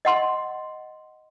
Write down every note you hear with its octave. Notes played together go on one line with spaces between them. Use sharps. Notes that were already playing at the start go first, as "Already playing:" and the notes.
D#5 F#5 C6